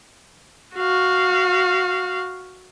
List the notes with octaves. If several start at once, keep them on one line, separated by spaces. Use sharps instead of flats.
F#4 F5